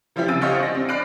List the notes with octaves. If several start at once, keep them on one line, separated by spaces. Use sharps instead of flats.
E3 F3 G3 E4 G4
C#3 C4 G#5 E6 A6 D7
G4 C5 C#5 D#5 F5 F#5
D4 A#6
C4
D5 B5 F6 F#6 C7 D7